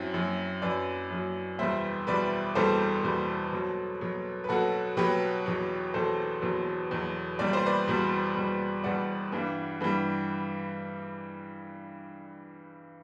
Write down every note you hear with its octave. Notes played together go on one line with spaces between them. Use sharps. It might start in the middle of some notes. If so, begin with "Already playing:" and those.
Already playing: F#2 F#3 C4 E4
F#2 F#3
F#2 F#3 B4 D5
F#2 F#3
E2 B2 G3 C5 E5
E2 B2 G3 B4 D5
E2 B2 G3 A4 C5
E2 B2 G3
B2 F#3
B2 F#3
B4
B2 F#3 F#4 A4
B2 F#3 G4 B4
E2 B2 F#3
E2 B2 F#3 A4 C5
E2 B2 F#3
E2 B2 F#3
E2 B2 G3 D5
C5
B4 D5
E2 B2 G3
E2 B2 G3
E2 B2 G3 D5 F#5
G2 E3 G3
G2 E3 G3